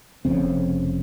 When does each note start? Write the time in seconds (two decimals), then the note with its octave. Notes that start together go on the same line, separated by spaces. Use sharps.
0.25 F1 F2 C#3 C4